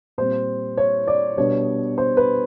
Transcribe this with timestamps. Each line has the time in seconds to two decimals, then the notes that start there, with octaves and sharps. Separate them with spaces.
0.18 A#2 G3 C4 C5
0.77 C#5
1.07 D5
1.37 B2 G3 B3 D4 C#5
1.98 C5
2.17 B4